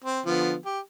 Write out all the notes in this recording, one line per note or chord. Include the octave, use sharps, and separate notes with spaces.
C4
D3 F3 B3
G4